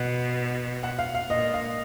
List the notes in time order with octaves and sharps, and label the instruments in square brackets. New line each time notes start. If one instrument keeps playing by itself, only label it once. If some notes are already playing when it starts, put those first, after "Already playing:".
Already playing: [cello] B2 [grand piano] F#5
[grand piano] F#5
F5
F5
[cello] A#2 [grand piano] D#5
[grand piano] F5